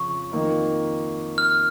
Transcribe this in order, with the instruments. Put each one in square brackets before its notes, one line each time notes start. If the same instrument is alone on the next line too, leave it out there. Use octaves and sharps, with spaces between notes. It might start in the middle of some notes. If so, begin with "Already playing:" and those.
Already playing: [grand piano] F2 C#3 [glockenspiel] C#6
[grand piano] F2 D#3 A#3 D#4 A#4
[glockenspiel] F6